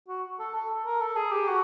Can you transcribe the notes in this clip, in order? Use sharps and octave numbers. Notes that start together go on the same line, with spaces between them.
F#4
A4
A4
A#4
A4
G#4
G4
F#4